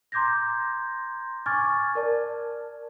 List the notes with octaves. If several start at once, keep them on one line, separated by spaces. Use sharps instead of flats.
A#5 C6 D6 G6 G#6 A#6
G#5 C#6 D6 F6 G#6 A6
A#4 D5 A5